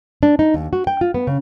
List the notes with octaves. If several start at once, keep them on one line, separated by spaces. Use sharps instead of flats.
D4
D#4
D#2
F#4
G5
F4
B3
C#3